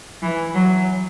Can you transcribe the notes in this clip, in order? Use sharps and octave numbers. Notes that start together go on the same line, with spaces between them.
E3
F#3